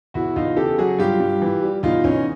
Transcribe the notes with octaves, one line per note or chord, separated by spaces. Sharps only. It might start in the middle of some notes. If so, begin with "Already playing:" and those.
E2 E4 F#4
E2 D#4 F4
C#3 G4 A4
F#3 F#4 G#4
G2 F4 G4
G2
E3
G3
E2 D#4 F4
E2 C#4 D#4